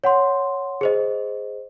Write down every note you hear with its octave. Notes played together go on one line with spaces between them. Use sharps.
C#5 F#5 C6
G#4 C5 D#5